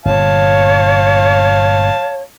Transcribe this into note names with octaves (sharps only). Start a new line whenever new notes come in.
G1 A#2 C#5 F5 A5